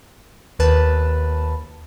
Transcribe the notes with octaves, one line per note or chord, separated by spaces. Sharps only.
D#2 B4 A5